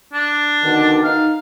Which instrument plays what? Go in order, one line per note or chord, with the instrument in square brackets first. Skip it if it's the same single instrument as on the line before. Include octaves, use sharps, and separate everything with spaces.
[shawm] D4
[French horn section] B2 D3 D#3
[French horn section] D#4 [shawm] F5